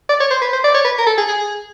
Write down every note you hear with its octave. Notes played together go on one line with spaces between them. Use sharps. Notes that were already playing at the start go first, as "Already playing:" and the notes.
D5
C#5
C5
B4
C5
D5
C#5
B4
A#4
A4
G#4
G#4